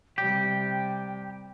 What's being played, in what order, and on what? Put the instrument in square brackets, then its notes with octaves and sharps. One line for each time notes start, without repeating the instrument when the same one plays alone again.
[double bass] C3 G3 [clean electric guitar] G4 [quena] G5